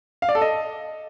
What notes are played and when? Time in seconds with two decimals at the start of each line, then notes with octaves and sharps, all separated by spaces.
0.22 F5
0.29 D5
0.35 A4
0.41 D#5